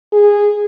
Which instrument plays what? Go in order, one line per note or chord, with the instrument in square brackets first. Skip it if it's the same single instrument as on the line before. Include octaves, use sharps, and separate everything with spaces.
[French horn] G#4